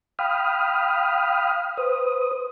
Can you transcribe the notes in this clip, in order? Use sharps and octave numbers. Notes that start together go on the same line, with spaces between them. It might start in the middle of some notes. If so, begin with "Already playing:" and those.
F5 G5 B5 D#6 F6
B4 C5 D#6